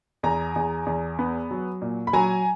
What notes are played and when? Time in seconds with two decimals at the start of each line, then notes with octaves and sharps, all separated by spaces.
0.23 E2 G#5 A#5
0.56 E2
0.86 E2
1.19 B3
1.51 F#3
1.82 A#2
2.07 B5
2.13 F#3 G#5 A#5